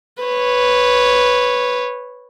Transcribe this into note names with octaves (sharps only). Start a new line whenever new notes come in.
B4 C#5